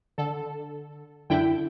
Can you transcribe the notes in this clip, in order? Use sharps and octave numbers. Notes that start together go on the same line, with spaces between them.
D3 A4
F#2 D3 E4 G5